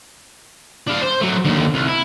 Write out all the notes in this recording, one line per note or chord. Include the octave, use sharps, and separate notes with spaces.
D4 F5
C5
F#3 A3
D#2 D3
C2
E4